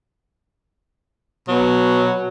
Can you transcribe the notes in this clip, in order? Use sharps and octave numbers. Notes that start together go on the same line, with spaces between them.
B2 F#3